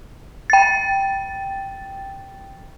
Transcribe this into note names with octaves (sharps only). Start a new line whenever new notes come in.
G5 A6